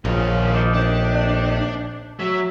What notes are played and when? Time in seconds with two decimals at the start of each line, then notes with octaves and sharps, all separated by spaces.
0.05 A#1 D#2 C#3 F4
0.54 F3 D4 D#4
0.74 A2 C3 D#3 D4
2.19 F#3 E5